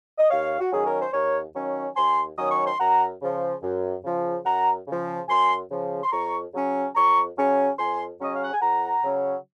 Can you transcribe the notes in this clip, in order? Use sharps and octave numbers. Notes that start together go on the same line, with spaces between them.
D#5
D#2 C#5 F5
F#4
D#3 F#3 C#4 G#4
A#4
C5
D#2 A#4 C#5
D#3 F#3 C#4
D#2 G#5 C6
D#3 F#3 C#4 D#6
C#6
C6
F#2 F#5 A#5
C#3 F3
F#2
C#3 F3
F#2 F#5 A#5
C#3 F3
F#2 G#5 C6
C#3 F3
C6
F2 A#5 C#6
C#3 F#3 C#4
F2 A#5 C#6
C#3 F#3 C#4
F2 G#5 C6
C#3 F#3 C#4 D#5
F5
F#5
G#5
F2 F#5 A#5
C#3 F#3 C#4